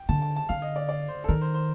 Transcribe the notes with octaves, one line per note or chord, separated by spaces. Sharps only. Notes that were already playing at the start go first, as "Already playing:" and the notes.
Already playing: G5
D3 A5
A5
A5
D3 F5
D#5
D5
D5
C5
A4
D#3 A#4
C5
C5